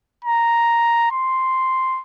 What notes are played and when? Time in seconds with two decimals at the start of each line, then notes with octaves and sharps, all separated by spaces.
0.24 A#5
1.11 C6